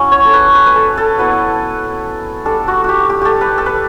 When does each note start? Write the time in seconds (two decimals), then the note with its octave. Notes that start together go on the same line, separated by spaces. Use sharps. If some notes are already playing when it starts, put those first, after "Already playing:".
Already playing: F#3 C#4 E4
0.12 C#5
0.25 A4
0.33 B4
0.55 B4
0.66 B4
0.75 A4
0.97 A4
1.18 F#3 B3 E4 B4
2.45 G3 D4 A4
2.68 F#4
2.84 F#4 G4
3.09 G4
3.21 G4 A4
3.41 B4
3.58 A4
3.66 B4